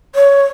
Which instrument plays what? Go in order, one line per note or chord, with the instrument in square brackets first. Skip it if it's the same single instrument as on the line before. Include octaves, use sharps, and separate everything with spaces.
[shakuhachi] C#5